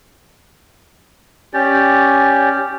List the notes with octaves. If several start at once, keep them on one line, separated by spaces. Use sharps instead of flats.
C#4 G4 D5